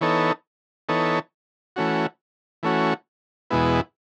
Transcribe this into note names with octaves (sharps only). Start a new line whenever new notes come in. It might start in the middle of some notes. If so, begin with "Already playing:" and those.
E3 B3 D#4 A4 C#5
E3 B3 D#4 A4 C#5
E3 A3 C#4 F#4
E3 A3 C#4 F#4
E2 B2 G#3 B3 E4